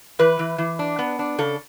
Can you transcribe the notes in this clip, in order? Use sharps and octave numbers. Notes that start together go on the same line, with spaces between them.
E3 B4
E3
E3
D4
B3
D4
C#3 A4